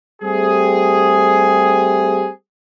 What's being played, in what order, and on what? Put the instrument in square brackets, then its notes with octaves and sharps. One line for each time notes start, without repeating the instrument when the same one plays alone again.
[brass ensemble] G3 A3 C4 G4 G#4